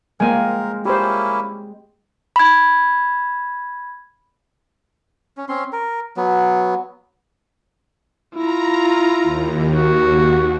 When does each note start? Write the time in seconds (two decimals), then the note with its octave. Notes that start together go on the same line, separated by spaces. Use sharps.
0.20 G#3 A#3 C4 A#4 G#5
0.85 A#3 C#4 E4 G4 C5
2.36 B5 G#6
5.37 C#4
5.49 C4 C#4 C6
5.73 A#4
6.17 F#3 B3
8.35 E4 F4 A#5
9.22 D#2
9.74 F#4